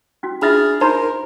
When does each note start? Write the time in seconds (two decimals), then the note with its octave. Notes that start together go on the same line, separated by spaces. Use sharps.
0.23 C#4 F#4
0.42 D4 F4 G#4 E5 B5 F6 A6
0.81 D#4 A#4 C5 A#5 B5